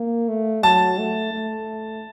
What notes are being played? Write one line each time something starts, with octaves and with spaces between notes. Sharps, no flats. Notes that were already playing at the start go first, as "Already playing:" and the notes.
Already playing: A#3
A3
F#3 A5
A3
A3